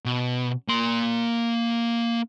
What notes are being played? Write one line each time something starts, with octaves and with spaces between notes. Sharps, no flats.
B2
A#3 C6